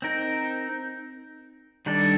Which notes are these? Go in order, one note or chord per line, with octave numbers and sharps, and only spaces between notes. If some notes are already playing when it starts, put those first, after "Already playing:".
C4 D#4 A#4
D#3 G3 D4 A4